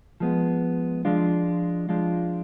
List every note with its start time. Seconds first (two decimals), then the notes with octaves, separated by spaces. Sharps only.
0.20 F3 G#3 B3
1.05 F3 G#3 D4 F4
1.89 F3 G#3 D4 F4